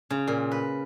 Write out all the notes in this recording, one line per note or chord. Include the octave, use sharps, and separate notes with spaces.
C#3
A#2
B4